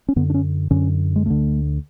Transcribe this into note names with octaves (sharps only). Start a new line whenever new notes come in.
C#4
F#2 D3 B3
D4
C#4
F#2 D3 C#4
G#3
D2 D3 A3